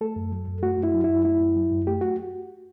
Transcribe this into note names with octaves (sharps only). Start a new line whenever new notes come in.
A3 A4
F#2
F#3
F#2
A3 F#4
F#2
E4
F#3
E4
F#2
A3 E4
F#2
F#3
F#2
A3 G4
F#4